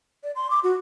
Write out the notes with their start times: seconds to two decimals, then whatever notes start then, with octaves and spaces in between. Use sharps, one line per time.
0.23 D5
0.36 C6
0.50 D6
0.63 F#4